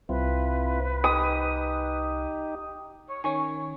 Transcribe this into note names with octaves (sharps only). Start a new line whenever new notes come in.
C2 C4 E4 F4 B4
D#4 G4 D#6
C#5
D#3 C#4 G#5 C#6